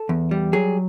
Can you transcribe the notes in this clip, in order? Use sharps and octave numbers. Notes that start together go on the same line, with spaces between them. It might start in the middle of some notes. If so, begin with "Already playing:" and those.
Already playing: A4
E2
G3
F#3 G#4